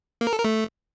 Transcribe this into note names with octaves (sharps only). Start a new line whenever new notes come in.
A#3
A#4
A4
A#4
A3